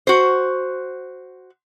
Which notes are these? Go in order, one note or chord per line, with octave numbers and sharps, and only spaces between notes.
F#4 C5